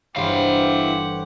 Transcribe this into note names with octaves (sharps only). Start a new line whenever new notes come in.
G1 E3 E4 G4 C5 C#5 F5 F#5